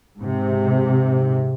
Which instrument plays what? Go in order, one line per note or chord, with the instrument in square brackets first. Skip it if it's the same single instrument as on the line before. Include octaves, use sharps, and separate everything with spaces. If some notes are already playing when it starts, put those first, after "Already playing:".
[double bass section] G#2 C3